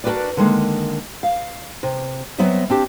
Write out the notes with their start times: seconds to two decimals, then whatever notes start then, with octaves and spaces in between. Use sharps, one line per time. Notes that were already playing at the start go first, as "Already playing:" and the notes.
0.04 D4 F#4 G4 A#4 B4 D5
0.37 D3 D#3 G#3 A#3
1.23 F5
1.83 C3
2.38 F#3 B3 C4 D#5 E5
2.69 C4 D4 G4